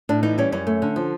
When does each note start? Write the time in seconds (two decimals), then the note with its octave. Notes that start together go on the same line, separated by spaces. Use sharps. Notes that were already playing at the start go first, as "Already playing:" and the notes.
0.09 A2 D4
0.23 E3 D#4
0.38 G3 C#4
0.52 F#2 C#4
0.67 A3
0.82 D3
0.96 F3